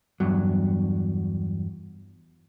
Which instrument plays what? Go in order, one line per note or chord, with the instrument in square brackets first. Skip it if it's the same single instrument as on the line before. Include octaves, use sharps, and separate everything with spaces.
[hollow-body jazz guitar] E2 G2 F#3